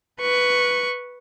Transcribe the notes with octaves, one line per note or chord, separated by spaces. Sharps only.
B4 C#6